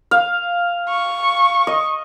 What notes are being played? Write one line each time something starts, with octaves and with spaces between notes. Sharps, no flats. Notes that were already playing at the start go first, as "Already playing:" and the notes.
F5
C#6
D#5